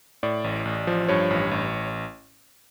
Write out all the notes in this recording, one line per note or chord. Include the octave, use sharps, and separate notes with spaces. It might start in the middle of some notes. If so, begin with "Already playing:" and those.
A2 D5
A1
A1
F3
G2 C#5
A1
A1